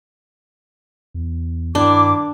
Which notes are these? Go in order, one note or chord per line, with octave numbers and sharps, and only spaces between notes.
E2
G2 D#3 D4 E4 D6